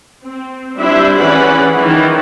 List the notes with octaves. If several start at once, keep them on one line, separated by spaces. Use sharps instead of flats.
C4
G3 C4 D4 E4 C5 E5
E3 C#4 G#4 B4 D5 F#5
D#3 E3